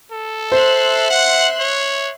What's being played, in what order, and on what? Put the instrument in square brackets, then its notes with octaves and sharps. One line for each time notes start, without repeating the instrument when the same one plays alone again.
[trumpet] A4
[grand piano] C5 [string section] E5 C6 F#6
[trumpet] F#5
C#5